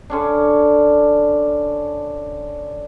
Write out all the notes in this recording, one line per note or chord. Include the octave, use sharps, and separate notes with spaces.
D3 C#4 D4